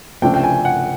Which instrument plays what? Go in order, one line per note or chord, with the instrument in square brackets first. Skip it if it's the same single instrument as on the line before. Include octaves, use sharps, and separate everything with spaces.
[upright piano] C#2 C3 F3 A3 D4 G5
G5
G#5
F#5